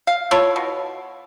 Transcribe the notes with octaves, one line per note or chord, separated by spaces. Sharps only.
F5
E4 F4 A4 C#5
B2